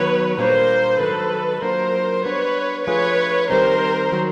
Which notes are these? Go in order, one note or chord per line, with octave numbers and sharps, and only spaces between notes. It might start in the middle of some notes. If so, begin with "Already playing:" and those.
Already playing: D#3 F#3 B3 B4 C#5
A#2 G3 A#3 D4 A#4 C5
G#2 D#3 F#3 A4 B4
F#3 A#3 D4 F4 A#4 C5
G3 B3 D4 B4 C#5
F3 A3 D4 F4 G#4 B4 C#5
D#3 G3 C4 D#4 A#4 C5
D#3 F#3